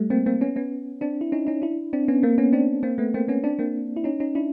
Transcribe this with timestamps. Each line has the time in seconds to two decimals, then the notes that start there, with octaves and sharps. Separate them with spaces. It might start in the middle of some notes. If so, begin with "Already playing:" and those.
Already playing: G3 A3
0.10 A#3 C4
0.26 A#3 C4
0.41 B3 C#4
0.56 B3 C#4
1.01 C4 D4
1.21 E4
1.32 C#4 D#4
1.47 C#4 D#4
1.62 D4 E4
1.93 C4 D4
2.08 B3 C#4
2.23 A#3 C4
2.38 B3 C#4
2.53 C4 D4
2.83 A#3 C4
2.98 A3 B3
3.14 A#3 C4
3.28 B3 C#4
3.44 C4 D4
3.59 A#3 C4
3.96 E4
4.04 C#4 D#4
4.20 C#4 D#4
4.35 D4 E4